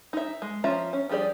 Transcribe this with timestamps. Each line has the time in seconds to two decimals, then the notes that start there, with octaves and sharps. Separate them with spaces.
0.13 D#4 E5
0.42 G#3
0.64 F3 C#4 F4 E5 A#5
0.93 C#4
1.09 F3 G3 G4 G#4 D5